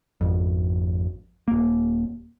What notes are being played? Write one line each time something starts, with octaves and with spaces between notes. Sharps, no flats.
G#1 F2
D#1 A#3